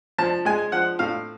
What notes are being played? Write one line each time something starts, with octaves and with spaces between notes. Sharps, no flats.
F3 A5
G#3 G#5
F3 F#5
A2 F5